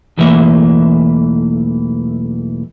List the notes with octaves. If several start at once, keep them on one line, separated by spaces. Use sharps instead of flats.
B1 E2 E3 A3 A#3 E5